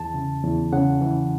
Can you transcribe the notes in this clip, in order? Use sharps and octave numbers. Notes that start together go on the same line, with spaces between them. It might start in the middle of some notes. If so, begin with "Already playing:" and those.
Already playing: E2 A5
C#3
E2
C#3 F#5
E3